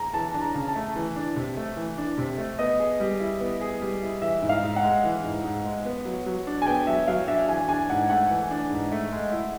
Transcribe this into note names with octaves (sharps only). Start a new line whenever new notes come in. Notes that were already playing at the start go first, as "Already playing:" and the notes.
Already playing: A#5
E3 A5
D4
A#5
C#3
A5
A3
E3
D4
C3
A3
E3
D4
C3
A3
B3 D#5
G#4
G3
E4
B3
G#4
G3
E4
E3 E5
G#2
F5
G#2
F#5
G#3
E3
G#2
G#2
G#3
B3
F#3
F#3
D4
G#5
B3 G5
F#3 E5
F#3 F5
D4 E5
E3 G#5
D4 G#5
G#2 F#5
A3 F#5
E3
D4
G#2
A3
G#3
E4